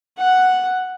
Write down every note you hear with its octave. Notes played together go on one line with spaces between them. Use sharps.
F#5